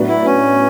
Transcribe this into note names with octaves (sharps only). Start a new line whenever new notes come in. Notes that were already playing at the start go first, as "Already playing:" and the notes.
Already playing: A2 F#3 B3 D4 F#4
E4
C#4